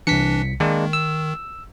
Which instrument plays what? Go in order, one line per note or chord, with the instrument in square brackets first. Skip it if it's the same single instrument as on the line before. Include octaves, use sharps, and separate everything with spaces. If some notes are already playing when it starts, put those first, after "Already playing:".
[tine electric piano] C2 B6 C#7 [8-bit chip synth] E3 D4
[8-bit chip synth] D#3 [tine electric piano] G#3 A#3 D4
[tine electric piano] E6